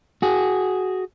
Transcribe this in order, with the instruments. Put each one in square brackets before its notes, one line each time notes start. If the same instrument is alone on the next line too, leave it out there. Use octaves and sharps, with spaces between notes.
[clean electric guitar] F#4 G#4